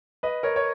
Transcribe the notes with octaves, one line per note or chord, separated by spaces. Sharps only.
B4 D#5
A#4 C#5
C#5